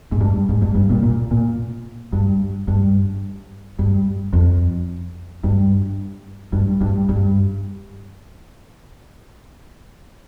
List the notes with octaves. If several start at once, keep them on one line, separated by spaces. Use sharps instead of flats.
G#2
G2
G#2
G2
G2
A#2
A#2
A#2
G2
G2
G2
F2
G2
G2
G2
G2